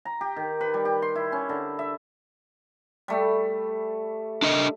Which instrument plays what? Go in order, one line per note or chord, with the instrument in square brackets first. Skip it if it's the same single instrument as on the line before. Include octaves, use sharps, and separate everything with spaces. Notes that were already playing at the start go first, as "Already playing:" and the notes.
[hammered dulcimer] A#5
G4
D#3
B4
G3
G4
C6
E4
C#4
D3
E5
G3 A3
[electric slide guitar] D4 A#4 D#5